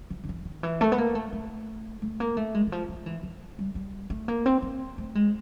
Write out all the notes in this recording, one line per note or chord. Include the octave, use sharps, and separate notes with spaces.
F3
D#3
E3
D#3
E3
A3
B3
A#3
A3
A3
A3
A#3
A3
G#3
E3
F3
F3
E3
F3
G3
G3
A3
A#3
C4
A#3
A3
G#3